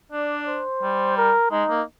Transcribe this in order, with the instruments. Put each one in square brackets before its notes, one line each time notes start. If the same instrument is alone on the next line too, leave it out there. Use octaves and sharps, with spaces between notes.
[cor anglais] D4 [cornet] D5
[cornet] C5
[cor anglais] G3
[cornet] A#4
[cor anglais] G#3 [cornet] D#4
[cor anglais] A#3